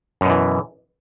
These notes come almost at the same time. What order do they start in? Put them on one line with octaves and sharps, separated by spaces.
F#2 B2 E3